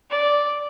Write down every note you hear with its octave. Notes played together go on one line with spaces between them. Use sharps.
D5